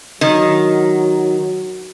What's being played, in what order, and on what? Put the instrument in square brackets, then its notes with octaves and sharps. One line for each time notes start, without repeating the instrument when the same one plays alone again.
[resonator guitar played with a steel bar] D#3 [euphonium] F#3